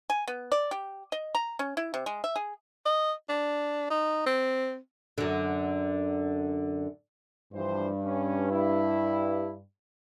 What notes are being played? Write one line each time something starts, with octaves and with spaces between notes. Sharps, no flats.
G#5
B3
D5
G4
D#5
A#5
C#4
E4
C3
G#3
E5
G#4
D#5
D4
D#4
C4
F#2 D3
G2 E3 F3 C5
C#4
E4